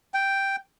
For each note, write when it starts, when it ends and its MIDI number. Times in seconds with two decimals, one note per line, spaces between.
0.14 0.56 79